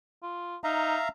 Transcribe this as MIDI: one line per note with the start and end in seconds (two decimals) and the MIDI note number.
0.23 0.56 65
0.64 0.97 63
0.64 1.08 76
0.64 1.08 77
0.64 1.08 82